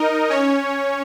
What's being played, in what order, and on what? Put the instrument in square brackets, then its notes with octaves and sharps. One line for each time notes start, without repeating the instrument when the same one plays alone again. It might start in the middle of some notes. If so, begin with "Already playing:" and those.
Already playing: [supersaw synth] D#4 A#4 D#5
C#4 C#5